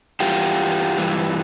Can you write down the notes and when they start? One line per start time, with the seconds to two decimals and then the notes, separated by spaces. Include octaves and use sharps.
0.20 G2 E3 F4 G4
0.97 G2 E3